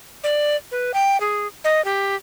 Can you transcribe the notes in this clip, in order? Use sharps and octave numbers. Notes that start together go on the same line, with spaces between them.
D5
B4
G5
G#4
D#5
G4